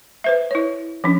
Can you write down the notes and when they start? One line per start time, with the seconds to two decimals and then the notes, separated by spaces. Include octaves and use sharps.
0.24 B4 C5 E5
0.51 E4 C#5
1.04 F3 C#4 D4